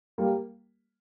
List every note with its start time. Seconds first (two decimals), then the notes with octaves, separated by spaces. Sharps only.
0.18 G3 A#3